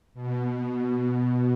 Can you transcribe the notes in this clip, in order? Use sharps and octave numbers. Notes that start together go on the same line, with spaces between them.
B2